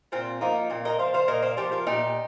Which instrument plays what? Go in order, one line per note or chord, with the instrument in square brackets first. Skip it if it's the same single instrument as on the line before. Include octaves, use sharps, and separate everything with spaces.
[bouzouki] A#2 C4 F4
F3 A#3 D#4
A#2 C4
A#4 D#5
F3 C5 F5
C5 F5
A#2 A#4 D#5
C5 F5
F3 G4 C5
F4 A#4
A#2 D#4 G4